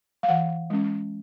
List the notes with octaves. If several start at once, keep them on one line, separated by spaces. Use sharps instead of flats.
F5
E3 F#5
G#3 C#4